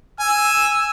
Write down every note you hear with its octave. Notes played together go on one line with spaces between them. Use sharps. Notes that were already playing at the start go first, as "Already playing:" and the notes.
G#5 E6